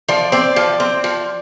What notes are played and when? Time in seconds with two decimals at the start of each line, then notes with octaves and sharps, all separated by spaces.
0.08 F3 D5
0.32 C4 D5
0.56 F3
0.80 C4
1.04 F3